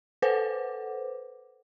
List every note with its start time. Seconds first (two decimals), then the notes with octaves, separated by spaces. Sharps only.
0.22 A4 B4 C5 F#5 D6